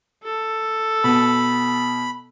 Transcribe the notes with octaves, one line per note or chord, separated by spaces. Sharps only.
A4
B2 B5